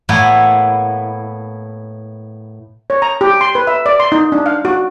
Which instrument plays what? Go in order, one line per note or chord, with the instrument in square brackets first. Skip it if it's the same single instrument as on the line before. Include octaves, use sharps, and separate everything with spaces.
[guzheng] A2 A#3 B3 E4
[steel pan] C#5
A#5
G4
C6
B4
E5
D5
C6
D#4
D4
F5
F#4